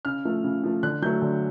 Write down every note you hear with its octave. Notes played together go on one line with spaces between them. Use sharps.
C#3 F6
F3 A3
C#3
F3 A3
D3 F#6
F#3 A3 G6
D3